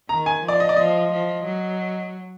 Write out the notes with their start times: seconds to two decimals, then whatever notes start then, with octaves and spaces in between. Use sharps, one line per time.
0.09 D#3 A#5
0.26 G#5
0.44 F3 D5
0.60 D#5
0.69 D5
0.77 F3 D#5
1.12 F3
1.44 F#3